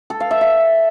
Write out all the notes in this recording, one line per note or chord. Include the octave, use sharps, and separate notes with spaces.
A4
F5
E5
E5